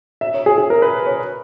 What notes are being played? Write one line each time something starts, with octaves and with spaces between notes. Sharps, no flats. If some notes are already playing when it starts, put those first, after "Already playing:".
E5
C#5
G#4
G#4
A#4
B4
C#5